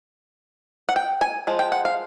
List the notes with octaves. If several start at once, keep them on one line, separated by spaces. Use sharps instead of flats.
F#5
G5
G#5
F3 G#3
G5
F#5
F5